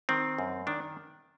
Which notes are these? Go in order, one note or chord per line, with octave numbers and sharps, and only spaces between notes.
D#3 C4
F#2
D#3 D4